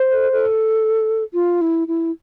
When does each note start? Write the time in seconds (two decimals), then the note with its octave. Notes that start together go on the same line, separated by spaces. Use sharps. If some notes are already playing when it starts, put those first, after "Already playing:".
Already playing: C5
0.11 A4
0.32 A4
1.34 F4
1.61 E4
1.88 E4